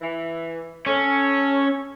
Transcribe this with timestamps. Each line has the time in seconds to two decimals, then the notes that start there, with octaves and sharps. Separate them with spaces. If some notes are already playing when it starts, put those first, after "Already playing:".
0.01 E3
0.86 C#4 A4 C#5